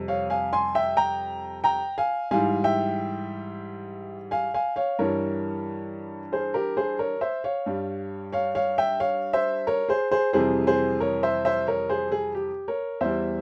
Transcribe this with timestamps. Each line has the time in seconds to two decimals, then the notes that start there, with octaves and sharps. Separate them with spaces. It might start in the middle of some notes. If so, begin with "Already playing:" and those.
Already playing: F2 C3 G3
0.08 C#5 F5
0.30 F5 G#5
0.53 G#5 C6
0.75 E5 G5
0.97 G5 A#5
1.64 G5 A#5
1.98 F5 G#5
2.31 G#2 E3 G3 F5 G#5
2.64 E5 G5
4.31 F5 G#5
4.54 F5 G#5
4.76 C#5 F5
4.99 G2 E3 G3 A#4 C#5
6.32 G#4 C5
6.54 G4 A#4
6.77 G#4 C5
6.99 A#4 C#5
7.21 C5 E5
7.44 C#5 F5
7.66 G2 G3
8.32 C#5 F5
8.55 C#5 F5
8.78 E5 G5
9.00 C#5 F5
9.33 C5 E5
9.67 A#4 C#5
9.89 G#4 C5
10.11 G#4 C5
10.33 F2 C3 E3 G3 G#4 C5
10.67 G#4 C5
11.00 A#4 C#5
11.23 C5 E5
11.45 C5 E5
11.67 A#4 C#5
11.89 G#4 C5
12.12 G#4
12.35 G4
12.68 A#4 C#5
13.01 E2 E3 G3 C5 E5